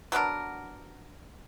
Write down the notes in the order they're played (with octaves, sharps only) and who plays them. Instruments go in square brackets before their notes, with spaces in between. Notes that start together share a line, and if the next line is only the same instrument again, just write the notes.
[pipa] F#3 B3 D4 A#4